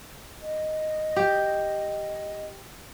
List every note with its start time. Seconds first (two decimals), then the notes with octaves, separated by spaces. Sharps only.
0.40 D#5
1.16 G4